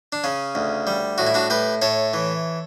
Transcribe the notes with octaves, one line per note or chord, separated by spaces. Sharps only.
D4
C#3 C#4
D2
G3
A2 F#4
E4
D4 F#4
A2 G4 B4
A2 A4 C#5
E3